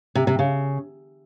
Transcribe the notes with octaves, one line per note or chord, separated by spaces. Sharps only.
C3
C3
C#3